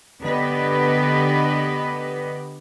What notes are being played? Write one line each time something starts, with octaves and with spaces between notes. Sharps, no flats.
D3 B3 G4 B4 D#5